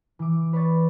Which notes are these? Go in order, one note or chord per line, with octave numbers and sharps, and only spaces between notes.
E3 D6
B4 C#5 D5 C#6 G#6 A6